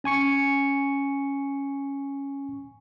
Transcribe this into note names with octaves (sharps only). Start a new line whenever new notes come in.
C#4 G#5 C#6 C#7